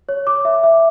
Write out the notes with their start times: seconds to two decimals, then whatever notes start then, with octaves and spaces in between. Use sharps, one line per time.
0.09 C#5
0.27 D6
0.45 E5
0.63 E5